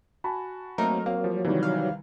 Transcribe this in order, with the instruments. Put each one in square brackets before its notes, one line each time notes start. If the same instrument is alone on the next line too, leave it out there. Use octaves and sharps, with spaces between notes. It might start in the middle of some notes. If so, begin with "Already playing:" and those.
[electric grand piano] F#4 [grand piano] G#5 A5 B5
[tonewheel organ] F#3 [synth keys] A3 D#4 A#4 [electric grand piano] A#3 C4
[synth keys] A#3 [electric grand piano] C4 [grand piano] F5
[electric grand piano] F3 G3
[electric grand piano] C3 E3 [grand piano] D#3 G3
[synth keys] F5